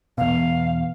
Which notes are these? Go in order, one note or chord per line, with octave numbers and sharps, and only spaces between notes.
E2 B2 F5